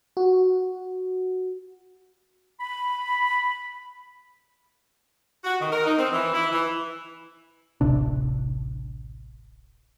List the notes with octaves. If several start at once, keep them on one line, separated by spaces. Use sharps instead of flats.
F#4
B5
F#4
D#3
A#4
D#4
C4
E3
E4
E3
D1 A1 C3 D4